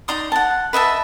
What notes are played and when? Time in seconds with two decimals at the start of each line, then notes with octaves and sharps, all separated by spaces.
0.08 D#4 D5 C6 D#6
0.32 F#5 A5
0.73 B4 D#5 E5 A5